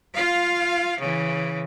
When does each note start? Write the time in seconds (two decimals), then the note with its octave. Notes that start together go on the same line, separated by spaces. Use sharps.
0.14 F4 F5
0.99 C#3 E3